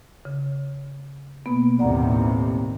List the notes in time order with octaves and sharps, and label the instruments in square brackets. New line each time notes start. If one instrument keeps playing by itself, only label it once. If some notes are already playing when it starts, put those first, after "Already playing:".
[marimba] C#3
B2 A#3 B3
[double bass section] A1 D#2 C3 [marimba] D5 F#5 A#5